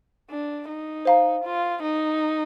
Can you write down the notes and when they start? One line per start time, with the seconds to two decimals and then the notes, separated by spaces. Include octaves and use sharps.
0.30 D4
0.68 D#4
1.05 C5 F5 A#5
1.44 F4
1.82 D#4